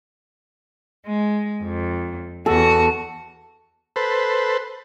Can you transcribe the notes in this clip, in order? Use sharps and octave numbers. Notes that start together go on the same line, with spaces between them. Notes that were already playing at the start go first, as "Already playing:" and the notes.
G#3
F2
E2 F#4 A4
A4 B4 C5